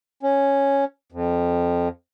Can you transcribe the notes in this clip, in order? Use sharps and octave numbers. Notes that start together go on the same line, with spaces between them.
C#4
F2